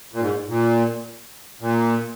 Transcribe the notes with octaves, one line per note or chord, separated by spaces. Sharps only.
A#2
G#2
A#2
A#2